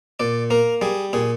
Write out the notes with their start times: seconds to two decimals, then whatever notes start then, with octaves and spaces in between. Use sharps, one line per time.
0.20 A#2 D5
0.50 A#3 A#4
0.82 G3 G#4
1.13 A#2 G#4